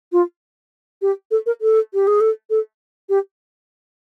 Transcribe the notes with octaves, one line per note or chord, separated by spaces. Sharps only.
F4
G4
A4
A#4
A4
G4
G#4
A4
A4
G4